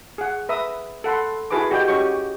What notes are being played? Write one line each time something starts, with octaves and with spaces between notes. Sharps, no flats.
G#4 F#5
B4 E5 A#5 D#6
A4 F#5 B5 C6
E4 F#4 G#4 B4 A5 D6
F#4 G4 D5 D#5 G5
C#4 F#4 G4 C#5 D#5 C#6